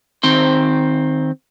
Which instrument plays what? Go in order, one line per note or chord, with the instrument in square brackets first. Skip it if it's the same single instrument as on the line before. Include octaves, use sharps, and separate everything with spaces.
[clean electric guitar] D#3 C4 C5